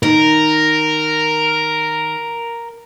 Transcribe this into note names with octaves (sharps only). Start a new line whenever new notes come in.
D#3 A#4